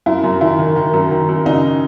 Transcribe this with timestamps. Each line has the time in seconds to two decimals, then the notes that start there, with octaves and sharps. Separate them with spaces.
0.06 F#2 E4
0.24 F#2
0.41 D#3 E4
0.59 D#3
0.76 D#3
0.94 F#2
1.11 D#3
1.29 F#2
1.46 C#3 D#4